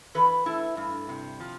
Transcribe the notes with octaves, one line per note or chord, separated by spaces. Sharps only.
E3 B4
A3 E4
G2
C3
F3